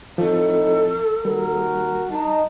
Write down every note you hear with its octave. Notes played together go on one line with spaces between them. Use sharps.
A2 F3 C4 D#4 A4
D#2 G3 F#4 A#4
D#4 A5